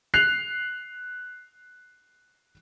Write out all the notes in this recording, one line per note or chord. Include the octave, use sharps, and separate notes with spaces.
F#6 C7 F7